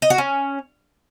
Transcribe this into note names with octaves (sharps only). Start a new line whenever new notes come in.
D#5
F#4
C#4